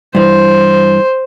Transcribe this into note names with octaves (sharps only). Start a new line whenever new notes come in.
G2 E3 C5